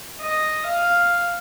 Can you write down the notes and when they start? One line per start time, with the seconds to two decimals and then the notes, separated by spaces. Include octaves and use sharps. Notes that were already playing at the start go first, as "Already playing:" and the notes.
0.22 D#5
0.67 F5